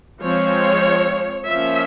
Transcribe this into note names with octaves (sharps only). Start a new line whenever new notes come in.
F3 G#3 C4 C#5
F3 A#3 C#4 E5